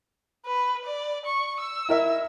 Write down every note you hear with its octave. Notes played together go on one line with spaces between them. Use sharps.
B4
D5
C#6
E6
E4 A#4 E5